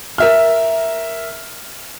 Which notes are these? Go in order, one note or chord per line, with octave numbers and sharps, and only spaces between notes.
A#4 E5 F6